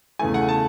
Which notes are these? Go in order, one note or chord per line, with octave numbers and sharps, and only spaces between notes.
E2 C#3 E3 A3 G#5
F#5
A5